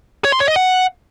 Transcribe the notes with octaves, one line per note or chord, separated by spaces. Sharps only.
C#5
C6
C#5
D#5
F#5